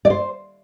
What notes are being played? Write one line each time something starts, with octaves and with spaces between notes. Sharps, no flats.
D5
C5